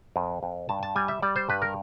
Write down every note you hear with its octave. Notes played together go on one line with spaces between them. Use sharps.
F2
F2
G2 A5
A5
G3 G#5
E5
G3 D5
C5
G2 B4
A#4